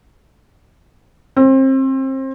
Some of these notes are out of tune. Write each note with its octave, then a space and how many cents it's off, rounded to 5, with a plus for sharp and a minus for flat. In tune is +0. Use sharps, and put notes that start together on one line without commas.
C4 +30